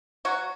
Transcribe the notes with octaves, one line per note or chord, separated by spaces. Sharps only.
F#3 F#4